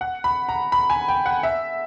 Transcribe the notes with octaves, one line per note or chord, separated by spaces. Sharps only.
F#5
B5
A#5
B5
G#5
G5
F#5
E5